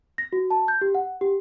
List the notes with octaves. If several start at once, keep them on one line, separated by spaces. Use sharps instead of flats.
A#6
F#4
A5
G6
G4
F#5
G4